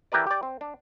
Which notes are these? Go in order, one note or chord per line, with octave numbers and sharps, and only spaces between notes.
E3 G4 A#4 B4 D5
G4 D5
C4
D4